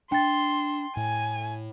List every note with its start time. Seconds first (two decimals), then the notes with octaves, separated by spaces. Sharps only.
0.12 D4 G5 C6 A6
0.97 A2 G#5